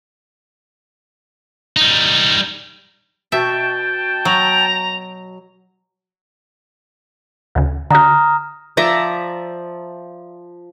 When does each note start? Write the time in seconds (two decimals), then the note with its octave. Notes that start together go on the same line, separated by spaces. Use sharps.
1.77 G3 D#4
3.32 B2 E5 G5 A5
4.25 F#3 A#5
7.55 D2 C#3
7.91 D3 F#4 A#5 D#6 F6
8.77 F3 D5 E5 A#5